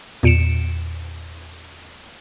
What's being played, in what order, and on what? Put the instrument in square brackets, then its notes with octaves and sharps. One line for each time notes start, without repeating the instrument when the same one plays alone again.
[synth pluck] E2 A#2 C#7 D7 E7